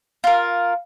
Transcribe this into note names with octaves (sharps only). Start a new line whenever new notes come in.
F4 A#4